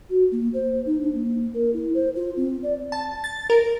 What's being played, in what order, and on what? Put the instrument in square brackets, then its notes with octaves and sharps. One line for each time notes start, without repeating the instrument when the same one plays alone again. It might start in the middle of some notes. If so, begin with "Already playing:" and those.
[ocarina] F#4
A#3
C5
D#4
D4
A#3
A#4
E4
C5
F4
C4
D5
[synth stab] A5
A6
A#4